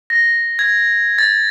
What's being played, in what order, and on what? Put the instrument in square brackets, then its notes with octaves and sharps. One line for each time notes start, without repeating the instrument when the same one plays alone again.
[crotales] A#6
G#6
A6